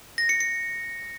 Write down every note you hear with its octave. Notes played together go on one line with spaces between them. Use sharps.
A#6
C#7
C#7